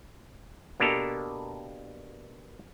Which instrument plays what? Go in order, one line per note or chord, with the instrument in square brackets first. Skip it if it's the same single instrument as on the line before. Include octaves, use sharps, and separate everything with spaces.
[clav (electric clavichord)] B2 A#3 D4 G4 A4 A#4